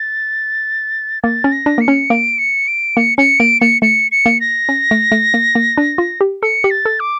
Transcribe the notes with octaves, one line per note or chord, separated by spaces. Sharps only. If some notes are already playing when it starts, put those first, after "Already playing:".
Already playing: A6
A#3 A6
C#4
A#6
D4
A#3 C#7
C#4
A#3 D7
C#7
D7
A#3 C#7
C#4 C#7
A#3 D7
A#3 C#7
A3 C#7
C#7
A#3
A#6
C#4
A3
A3
A#3
A#3
D4
F4
G4
A4 C#7
G4
A6
A4
D6